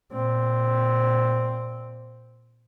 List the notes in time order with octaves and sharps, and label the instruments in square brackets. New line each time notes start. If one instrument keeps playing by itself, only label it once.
[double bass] A#2 C4